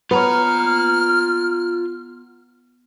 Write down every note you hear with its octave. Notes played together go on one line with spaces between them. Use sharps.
B3 F4 C#5 A#5 F6